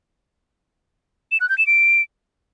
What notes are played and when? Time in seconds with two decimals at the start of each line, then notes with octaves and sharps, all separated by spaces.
1.32 E7
1.40 F#6
1.49 G6
1.58 E7
1.67 D7